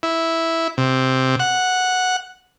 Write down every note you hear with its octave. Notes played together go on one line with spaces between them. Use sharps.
E4
C3
F#5